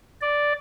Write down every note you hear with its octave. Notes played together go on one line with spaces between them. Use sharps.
D5